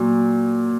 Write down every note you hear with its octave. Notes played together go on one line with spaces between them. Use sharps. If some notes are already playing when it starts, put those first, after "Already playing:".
Already playing: A#2 F#3